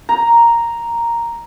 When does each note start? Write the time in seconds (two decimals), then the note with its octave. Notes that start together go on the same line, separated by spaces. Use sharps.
0.09 A#5